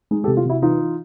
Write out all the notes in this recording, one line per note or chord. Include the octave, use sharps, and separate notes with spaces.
G#3 D#4
G4 A4
C3
F4 G4
C3 E4 F#4
E3 D#4 F4
E3